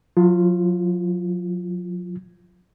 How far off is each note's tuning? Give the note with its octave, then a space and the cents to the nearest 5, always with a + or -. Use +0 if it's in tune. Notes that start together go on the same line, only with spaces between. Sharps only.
F#3 -45 F4 -15